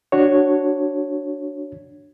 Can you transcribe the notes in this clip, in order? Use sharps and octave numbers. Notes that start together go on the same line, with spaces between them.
D4 F#4 C#5